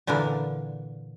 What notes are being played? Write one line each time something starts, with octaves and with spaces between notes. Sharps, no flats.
A#2 D3 E3 D4 A#4